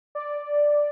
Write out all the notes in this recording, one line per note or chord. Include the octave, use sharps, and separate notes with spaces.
D5